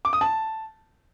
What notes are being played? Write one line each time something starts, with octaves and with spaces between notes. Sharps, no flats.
D6
D#6
A5